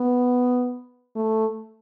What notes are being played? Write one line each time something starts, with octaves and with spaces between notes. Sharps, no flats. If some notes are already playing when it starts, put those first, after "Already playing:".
Already playing: B3
A3